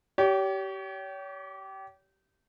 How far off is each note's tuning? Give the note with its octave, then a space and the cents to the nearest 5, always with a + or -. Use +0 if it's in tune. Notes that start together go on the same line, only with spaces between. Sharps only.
G4 -25 C#5 +35